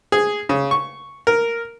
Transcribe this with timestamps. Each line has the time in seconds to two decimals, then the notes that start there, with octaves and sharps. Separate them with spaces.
0.12 G#4
0.49 C#3
0.71 C#6
1.27 A#4